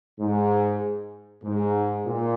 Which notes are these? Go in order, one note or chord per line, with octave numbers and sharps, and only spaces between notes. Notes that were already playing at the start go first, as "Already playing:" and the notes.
G#2
G#2
A#2